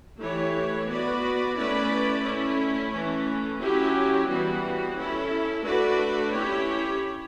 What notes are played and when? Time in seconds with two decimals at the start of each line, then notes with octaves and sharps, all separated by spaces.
0.20 E3 A3 E4 G4 C#5
0.88 B3 F#4 B4 D5
1.56 A3 C#4 E4 B4 D5
2.24 A3 C#4 E4
2.91 E3 A3 C#4
3.60 F#3 C#4 E4 G4
4.28 E3 G3 B3 F#4
4.95 C#4 E4 A4
5.64 A3 D4 F#4 B4 D5
6.32 C#4 E4 G4 C#5